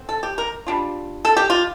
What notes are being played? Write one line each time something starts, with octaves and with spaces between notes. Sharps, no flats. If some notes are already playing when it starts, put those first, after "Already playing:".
Already playing: D3 C4
A4
G4
A#4
G3 D4 F4
A4
G4
F4